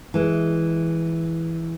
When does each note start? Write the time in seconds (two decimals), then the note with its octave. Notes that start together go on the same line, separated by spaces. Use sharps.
0.14 E3 G#3